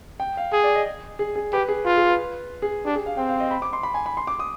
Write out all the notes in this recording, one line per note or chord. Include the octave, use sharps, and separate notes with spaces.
G5
F5
G#4
D5
D#5
G#4
G#4
G4 B4
G#4
F4 B4
G#4
B4
G#4
D4 G4
G#4
F5
C4 G5
F5
D#5
B5
D6
C6
B5
G#5
B5
C6
D6
D#6